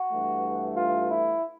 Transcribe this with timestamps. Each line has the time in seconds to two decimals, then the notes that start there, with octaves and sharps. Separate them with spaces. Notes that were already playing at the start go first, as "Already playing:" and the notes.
Already playing: F#4
0.11 G2 E3 A3
0.76 F4
1.09 E4